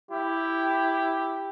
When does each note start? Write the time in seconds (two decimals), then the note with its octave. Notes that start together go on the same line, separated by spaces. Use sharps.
0.11 E4 G4